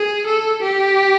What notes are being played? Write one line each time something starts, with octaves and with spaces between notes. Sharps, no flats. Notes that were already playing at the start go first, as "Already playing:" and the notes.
Already playing: G#4
A4
G4